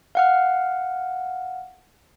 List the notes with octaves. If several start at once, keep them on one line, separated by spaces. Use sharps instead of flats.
F5 F#5 F6